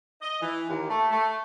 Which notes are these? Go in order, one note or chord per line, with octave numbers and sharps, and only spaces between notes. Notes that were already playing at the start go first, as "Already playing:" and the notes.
D#5
E3
D#2
A3
A3